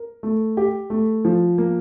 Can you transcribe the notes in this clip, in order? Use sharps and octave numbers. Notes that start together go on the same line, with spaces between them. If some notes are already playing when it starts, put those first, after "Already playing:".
Already playing: A#4
A3
G4
A3
F3
A#3